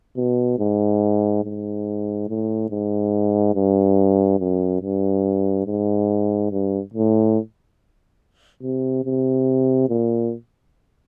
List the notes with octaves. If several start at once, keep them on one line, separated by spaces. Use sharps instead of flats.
B2
G#2
G#2
A2
G#2
G2
F#2
G2
G#2
G2
A2
C3
C3
A#2